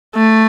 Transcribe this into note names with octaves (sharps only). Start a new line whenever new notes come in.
A3